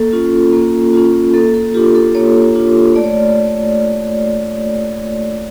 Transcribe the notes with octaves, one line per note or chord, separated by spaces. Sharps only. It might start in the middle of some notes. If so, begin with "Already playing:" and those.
Already playing: A#3 A4
C#4 F4
A#3
C#4 F4
A#3 A4
A4
D4 F4 G4
A4
A#3 C#5
D4 F4
A3 D5
C#5
D5